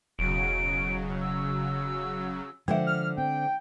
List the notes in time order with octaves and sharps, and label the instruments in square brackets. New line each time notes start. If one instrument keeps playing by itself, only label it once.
[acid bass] E1 [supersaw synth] C#3 F#3 [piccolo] D7
[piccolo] E6
[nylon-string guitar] D3 C5 F#5 [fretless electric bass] F3 [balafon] G#3 E5
[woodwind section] F6
[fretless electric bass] C4 [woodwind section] G5